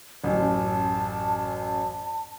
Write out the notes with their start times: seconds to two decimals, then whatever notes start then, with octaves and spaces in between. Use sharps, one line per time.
0.24 A1 F#2 A5